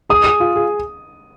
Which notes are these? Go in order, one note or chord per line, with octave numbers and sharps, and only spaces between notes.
G#4 D#6
G#4
F4
G#4